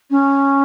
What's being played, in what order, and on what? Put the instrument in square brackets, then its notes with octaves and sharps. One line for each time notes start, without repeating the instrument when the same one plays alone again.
[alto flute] C#4